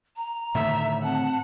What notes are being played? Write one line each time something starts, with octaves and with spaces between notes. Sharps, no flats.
A#5
A2 D3 D#3 E5
C4 F#5 A5